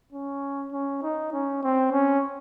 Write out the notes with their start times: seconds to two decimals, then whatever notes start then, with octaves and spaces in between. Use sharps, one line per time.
0.12 C#4
0.72 C#4
1.03 D#4
1.33 C#4
1.63 C4
1.92 C#4